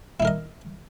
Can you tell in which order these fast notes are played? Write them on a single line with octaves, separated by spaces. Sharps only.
E4 D#4 A#4 D#5